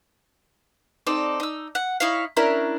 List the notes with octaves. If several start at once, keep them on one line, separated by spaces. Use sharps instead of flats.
C4 D#4 A4 D5
D#4 E6
F#5
D#4 E4 C#5 F5
C#4 D4 E4 A#4